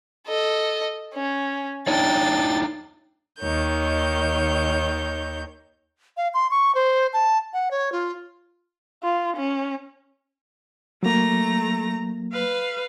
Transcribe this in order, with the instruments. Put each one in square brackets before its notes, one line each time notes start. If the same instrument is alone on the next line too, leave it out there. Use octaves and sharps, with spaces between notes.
[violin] A4 D#5
C#4
[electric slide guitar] D4 D#4 C#5 [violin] G5 A6
[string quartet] D#2 D#3 C#5 G6
[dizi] F5
C6
C#6
C5
A5
F#5
C#5
F4
[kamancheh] F4
C#4
[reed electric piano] F#3 A#3 [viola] A3 A#5
[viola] B4 F5